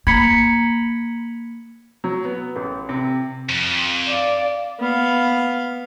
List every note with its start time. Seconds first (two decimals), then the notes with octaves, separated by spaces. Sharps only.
0.07 A#3 A#5 B5 G#6 B6 C#7
2.04 F#3
2.25 B3
2.56 A1
2.89 C3
3.49 F2
4.07 D5 F5
4.80 B3 F5